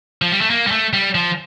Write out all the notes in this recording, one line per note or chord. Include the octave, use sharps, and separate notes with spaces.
F3
G3
A3
A#3
G3
A3
G3
F3